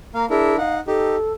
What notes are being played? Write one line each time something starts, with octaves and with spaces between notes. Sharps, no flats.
A#3 F5 A#5
D4 E4 G#4 A#4
D#4 F5 F#5
D#4 G4 A4